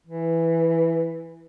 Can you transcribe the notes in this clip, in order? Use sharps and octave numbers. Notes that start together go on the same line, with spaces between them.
E3